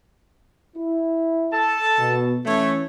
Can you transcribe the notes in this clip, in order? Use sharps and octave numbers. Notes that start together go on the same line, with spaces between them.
E4
A4 A5
B2
E3 A3 C#4 C#5